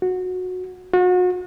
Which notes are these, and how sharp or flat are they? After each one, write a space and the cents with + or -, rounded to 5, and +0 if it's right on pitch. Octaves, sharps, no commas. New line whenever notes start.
F#4 -15
F#4 -35